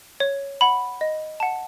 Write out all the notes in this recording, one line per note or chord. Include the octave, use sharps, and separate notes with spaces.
C#5
F#5 B5
D#5
F#5 A5